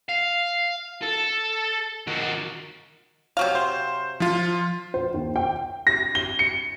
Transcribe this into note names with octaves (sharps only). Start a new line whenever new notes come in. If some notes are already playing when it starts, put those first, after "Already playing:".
F5
A4
D#3 F#4
C3 F#3 F5
C5
F3 F4
C5
D#2
G5
A#6
G7
C#7